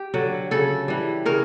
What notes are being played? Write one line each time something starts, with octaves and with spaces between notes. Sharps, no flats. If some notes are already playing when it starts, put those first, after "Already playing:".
Already playing: G4
D3 F#3
C#3 A4
E3 G3
C#3 A#4